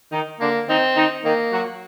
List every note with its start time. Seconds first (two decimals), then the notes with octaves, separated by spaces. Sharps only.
0.12 D#3 D#4
0.40 D3 A#3 D4
0.68 D#3 C4 D#4
0.96 D#3 D#4
1.24 D#3 A#3 D#4
1.53 F#3 F#4